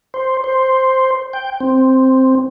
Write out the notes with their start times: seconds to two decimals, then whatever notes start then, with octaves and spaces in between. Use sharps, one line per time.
0.14 C5
0.44 C5
1.33 G5
1.60 C4